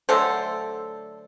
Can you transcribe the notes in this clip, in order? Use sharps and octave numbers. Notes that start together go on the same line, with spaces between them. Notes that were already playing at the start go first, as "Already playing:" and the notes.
D3 F#3 A3 D4 A4 C5